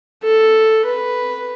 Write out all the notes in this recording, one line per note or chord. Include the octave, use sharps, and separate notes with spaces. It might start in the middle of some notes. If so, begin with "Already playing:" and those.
A4
B4